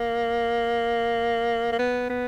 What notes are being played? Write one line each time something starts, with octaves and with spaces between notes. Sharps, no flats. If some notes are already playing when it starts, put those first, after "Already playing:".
Already playing: A#3
A#3
B3
B3